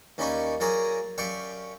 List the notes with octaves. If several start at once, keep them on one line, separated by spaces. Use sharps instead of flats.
D#2 C#4 D#4 D5 B5 C#6
F#3 A#3 G#4 D5 A#5 D#6
F#2 G4 D5 F5 G5 C#6